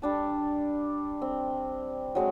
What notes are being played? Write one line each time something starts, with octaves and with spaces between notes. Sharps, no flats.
G3 D4 A5
C4
F#3 G#3 C4